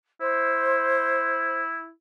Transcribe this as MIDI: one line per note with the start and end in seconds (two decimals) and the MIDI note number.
0.21 1.90 64
0.21 1.61 72